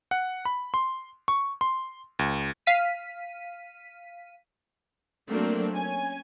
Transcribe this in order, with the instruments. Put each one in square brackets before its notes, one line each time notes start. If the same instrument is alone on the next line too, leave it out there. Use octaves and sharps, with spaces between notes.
[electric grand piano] F#5
B5
C6
C#6
C6
C#2
[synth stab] F5 B6 D#7
[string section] F#3 A3 A#3 C4 D4
C#4 G#5